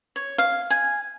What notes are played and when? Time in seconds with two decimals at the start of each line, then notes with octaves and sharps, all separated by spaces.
0.16 C#5
0.38 F5
0.70 G#5